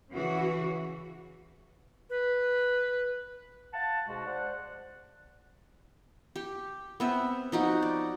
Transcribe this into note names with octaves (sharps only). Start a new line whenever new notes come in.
C#3 E3 F#4
B4
F5 F#5 A5
G#2 B2 G#3 F#4
C5 D5 F#5
G4
B3 C4 E5
F3 D#4 F#4
D5